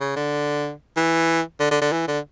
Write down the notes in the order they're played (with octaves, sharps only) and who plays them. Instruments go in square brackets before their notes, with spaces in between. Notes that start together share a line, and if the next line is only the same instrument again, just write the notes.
[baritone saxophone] C#3
D3
E3
D3
D3
D3
E3
D3